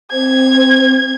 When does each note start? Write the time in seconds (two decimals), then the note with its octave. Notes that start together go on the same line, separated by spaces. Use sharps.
0.12 C4 C5 G#6